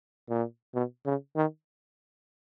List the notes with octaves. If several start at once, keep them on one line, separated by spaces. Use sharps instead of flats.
A#2
B2
C#3
D#3